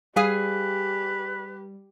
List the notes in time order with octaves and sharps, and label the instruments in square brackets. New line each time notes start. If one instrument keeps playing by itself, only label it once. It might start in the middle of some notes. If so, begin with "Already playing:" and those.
[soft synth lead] G3 [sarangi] G4 [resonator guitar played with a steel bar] G#4 F5 G#5 [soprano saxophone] B4